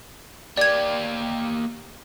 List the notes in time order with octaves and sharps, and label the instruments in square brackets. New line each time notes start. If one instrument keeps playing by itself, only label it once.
[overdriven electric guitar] A#3 G4 [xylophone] D5 G#6